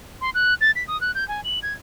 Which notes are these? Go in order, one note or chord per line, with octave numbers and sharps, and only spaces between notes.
C6
F#6
A6
B6
D#6
F#6
G6
G#5
F#7
G#6